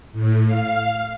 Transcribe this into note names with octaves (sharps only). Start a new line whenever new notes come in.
A2
F5